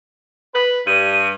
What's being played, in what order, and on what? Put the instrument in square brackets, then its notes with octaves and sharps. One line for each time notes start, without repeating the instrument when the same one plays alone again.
[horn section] B4
[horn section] G2 [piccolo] D#7